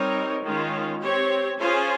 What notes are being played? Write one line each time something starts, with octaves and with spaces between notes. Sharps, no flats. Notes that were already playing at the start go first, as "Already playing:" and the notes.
Already playing: G3 C4 D#4 A#4 C#5
D#3 G#3 C#4 F4
C4 G4 C#5
C#4 F4 G#4 C5